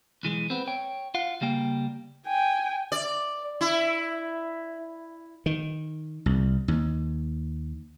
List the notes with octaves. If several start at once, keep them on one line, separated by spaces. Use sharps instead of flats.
B1 E3 G#3
B3 C4
C#5 G5
F4 F5 F#5
C#3 G3 A#3 G5
G5 G#5
D5
E4
D#3
C2
D#2